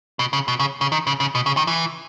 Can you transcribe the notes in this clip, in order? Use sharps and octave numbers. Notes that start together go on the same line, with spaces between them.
B2
C#3
B2
C#3
C#3
D#3
C#3
C#3
B2
C#3
D#3
E3